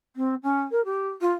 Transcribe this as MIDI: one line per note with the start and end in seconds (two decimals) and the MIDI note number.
0.16 0.35 60
0.43 0.61 61
0.71 0.83 70
0.85 1.08 67
1.21 1.31 65